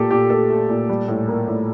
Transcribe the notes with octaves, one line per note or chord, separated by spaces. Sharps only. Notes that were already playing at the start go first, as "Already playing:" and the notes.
Already playing: A#2 A3 G4 A4
A#2 G4
A3 A4
A3
A#2
G3
A2
A#3
A2